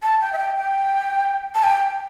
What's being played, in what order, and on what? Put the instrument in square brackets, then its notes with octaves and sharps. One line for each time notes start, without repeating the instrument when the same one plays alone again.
[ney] A5
G5
E5
G5
G5
A5
G5